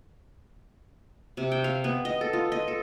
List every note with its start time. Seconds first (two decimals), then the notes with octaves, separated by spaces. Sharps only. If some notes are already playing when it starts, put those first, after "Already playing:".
1.37 C3
1.52 G5
1.64 F5
1.84 B3
2.05 D#5
2.21 A4
2.33 F4
2.52 D#5
2.68 A4